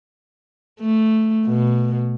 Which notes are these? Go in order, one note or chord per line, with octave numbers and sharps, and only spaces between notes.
A3
B2